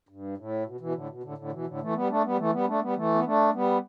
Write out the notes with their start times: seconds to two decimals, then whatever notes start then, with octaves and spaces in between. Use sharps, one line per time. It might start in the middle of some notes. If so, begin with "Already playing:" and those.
0.09 G2
0.38 A2
0.66 B2
0.81 B2 E3
0.94 A2 D3
1.09 B2
1.23 A2 D3
1.38 A2 D3
1.52 B2 E3
1.67 A2 D3
1.81 E3 A3
1.95 G3 B3
2.09 A3 D4
2.24 G3 B3
2.38 E3 A3
2.53 G3 B3
2.67 A3 D4
2.81 G3 B3
2.96 E3 A3
3.15 B3
3.24 A3 D4
3.53 G3 B3